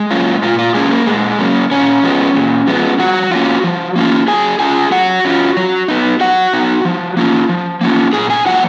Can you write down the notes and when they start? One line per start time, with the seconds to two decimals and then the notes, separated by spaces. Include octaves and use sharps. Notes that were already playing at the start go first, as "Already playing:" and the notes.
Already playing: G#3 G#4
0.11 F#3 A#3 C#4 F4
0.42 A#2 F4
0.59 F4
0.74 F#3 G#3 A#3 C#4 G#4
0.91 A#3 A#4
1.06 A#2 G#3 G#4
1.39 F#3 A#3 C#4
1.71 A#2 C#4 C#5
2.04 F3 G#3 B3
2.36 A#2
2.67 F3 G#3 B3
2.99 F3 F#4 F#5
3.31 A#3 C#4 F4
3.64 F3
3.96 A#3 C#4 F4
4.28 F#3 G#4 G#5
4.60 C#4 F4 G#4 G#5
4.92 F#3 F#4 F#5
5.25 C#4 F4
5.57 F#3
5.88 B3 D#4
6.20 F#3 F#4 F#5
6.53 B3 D#4
6.85 F3
7.17 A#3 C#4 F4
7.49 F3
7.81 A#3 C#4 F4
8.13 A#2 G#4 G#5
8.30 G#4 G#5
8.46 F3 A#3 F4 F#4 F#5